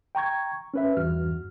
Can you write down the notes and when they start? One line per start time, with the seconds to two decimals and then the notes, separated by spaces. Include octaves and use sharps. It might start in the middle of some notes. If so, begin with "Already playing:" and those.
0.15 G5 A#5 C#6 G#6
0.74 C#4 B4 E5
0.97 E2 G2 E3 F#4 F6